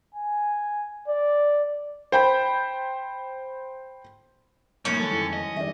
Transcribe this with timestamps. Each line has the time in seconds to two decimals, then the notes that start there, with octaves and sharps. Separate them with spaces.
0.14 G#5
1.08 D5
2.12 C5 G5 B5
4.85 B1 A2 C#3 F3 G3 A#3 C#4 D#4
5.00 D3 D#3 F#3 G#3 A4
5.12 F2 E4
5.33 D#5
5.56 D#3 G3 G#4 D5 E5